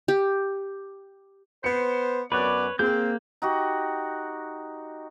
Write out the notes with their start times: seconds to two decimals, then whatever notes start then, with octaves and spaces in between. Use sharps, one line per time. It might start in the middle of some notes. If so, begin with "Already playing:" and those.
0.08 G4
1.64 B3 B4 C5 C#7
2.32 F#2 B3 B4 C#5 D5 F#6
2.79 A#3 C4 G#4 G6
3.42 D#4 F#4 G4